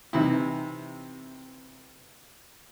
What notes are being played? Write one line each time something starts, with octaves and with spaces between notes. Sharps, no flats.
C3 E3 D#4 E4